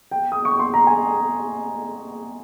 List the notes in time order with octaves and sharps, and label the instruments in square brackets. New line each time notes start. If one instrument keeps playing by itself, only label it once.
[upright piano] G5
D#6
C#6
C6
A#5
G#5